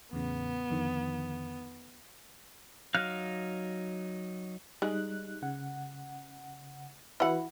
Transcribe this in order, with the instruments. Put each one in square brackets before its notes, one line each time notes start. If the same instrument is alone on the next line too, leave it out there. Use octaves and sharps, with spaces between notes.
[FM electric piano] E2 A2 C#3 [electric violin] B3
[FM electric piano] F2 D3 D#3
[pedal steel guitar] F#3 D#4 F5 F6 F#6
[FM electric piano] G3 D#4 F#6 [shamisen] G#3
[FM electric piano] C#3 F#5
[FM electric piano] E3 F#4 B4 [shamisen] E4 F#5